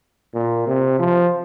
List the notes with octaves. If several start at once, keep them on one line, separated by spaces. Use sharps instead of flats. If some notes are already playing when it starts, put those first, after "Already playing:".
A#2
C3
F3